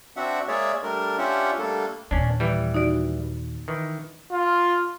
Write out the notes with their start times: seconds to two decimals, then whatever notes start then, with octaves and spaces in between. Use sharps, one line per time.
0.17 C4 D4 F#4 E5 F#5
0.48 G#3 A#3 G#4 C#5 D5 E5
0.83 G3 A3 D4 A#4
1.18 C#4 D4 F4 G4 E5 F#5
1.58 G3 A3 A#3 D4 A4
2.11 D#2 A#2 C#4 D4
2.40 E3 G3
2.74 D#4 F#4 D5
3.68 D#3 E3
4.32 F4